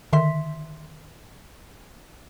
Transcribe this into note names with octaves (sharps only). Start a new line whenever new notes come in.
D3 D#3 E5 C6 B6